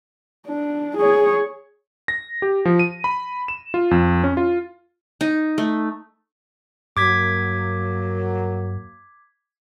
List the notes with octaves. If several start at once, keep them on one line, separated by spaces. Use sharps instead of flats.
D4
G#4 C#5
A#6
G4
F3
D#7
B5
E7
F4
F2
C#4
F4
D#4
A3
G2 F#3 A#3 D6 G#6 B6